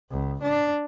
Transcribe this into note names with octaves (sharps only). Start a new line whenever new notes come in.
C#2
D4